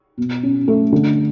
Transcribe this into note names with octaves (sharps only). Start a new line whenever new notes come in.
B2
C#4
A3
D3